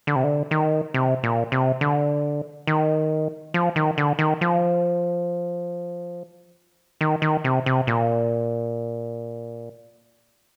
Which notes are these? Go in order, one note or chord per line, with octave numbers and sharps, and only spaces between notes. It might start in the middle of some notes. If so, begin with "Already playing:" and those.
D3
C3
D3
D#3
C3
A#2
C3
D3
D#3
F3
D#3
D3
D#3
F3
D#3
D#3
C3
C3
A#2